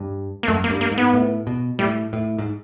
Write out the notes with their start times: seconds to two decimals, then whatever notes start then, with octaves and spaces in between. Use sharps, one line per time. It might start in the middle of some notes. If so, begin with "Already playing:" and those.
Already playing: G2
0.43 A#3
0.47 F#2 A3
0.64 A#3
0.70 G2
0.81 A#3
0.92 G#2
0.98 B3
1.14 A2
1.47 B2
1.79 A2 G3
2.13 A2
2.39 G#2